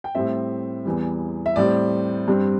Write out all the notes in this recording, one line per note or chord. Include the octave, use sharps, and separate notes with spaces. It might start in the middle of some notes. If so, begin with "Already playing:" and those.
G5
A2 G3 C4 E5
E2 E3 G3
E5
A2 G3 C4 D5
G2 G3 C4